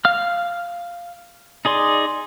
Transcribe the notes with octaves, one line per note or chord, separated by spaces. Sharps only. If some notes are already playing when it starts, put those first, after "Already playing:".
F5 F6
D#4 G#4 D5 C6